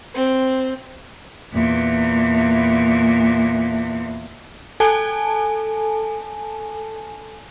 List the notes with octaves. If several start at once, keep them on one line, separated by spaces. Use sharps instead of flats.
C4
E2 A#2
A4 G#5 A5